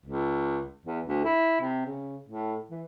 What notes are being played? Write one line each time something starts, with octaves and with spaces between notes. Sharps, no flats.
C#2
E2
D2
E4
C3
C#3
A2
E3